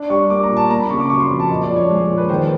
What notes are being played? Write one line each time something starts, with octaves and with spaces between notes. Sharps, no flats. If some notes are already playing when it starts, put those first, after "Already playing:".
Already playing: D4
G3 C#6
A#3 D6
A#5
A#2
A5
A#3 A#5
B5
C#3 C#6
D6
F#3 C#6
C6
F2 B5
A5
A#2 D#5
D5
F3
C#5
G#3
A#2
B4
D#3 C5